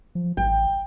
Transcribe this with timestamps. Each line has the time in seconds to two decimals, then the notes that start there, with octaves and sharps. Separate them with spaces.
0.15 F3
0.37 A1 G5